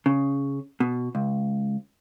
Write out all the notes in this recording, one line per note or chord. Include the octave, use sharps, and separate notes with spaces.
C#3
B2
C#2